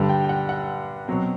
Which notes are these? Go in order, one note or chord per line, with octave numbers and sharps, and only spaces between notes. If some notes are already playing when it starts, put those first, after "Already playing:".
Already playing: G2 D3 G3
G5
G5
F#5
F#5
B2 F#3 C4